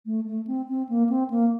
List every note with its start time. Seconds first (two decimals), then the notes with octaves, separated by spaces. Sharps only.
0.06 A3
0.27 A3
0.47 C4
0.68 C4
0.89 A#3
1.09 C4
1.30 A#3